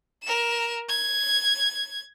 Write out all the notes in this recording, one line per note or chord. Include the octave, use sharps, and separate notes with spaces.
A#4 E7
G#6